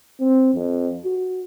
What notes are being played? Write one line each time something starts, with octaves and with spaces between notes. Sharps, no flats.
C4
F2
F#4